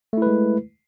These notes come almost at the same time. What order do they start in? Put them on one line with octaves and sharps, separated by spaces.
A3 E4 B4 G#3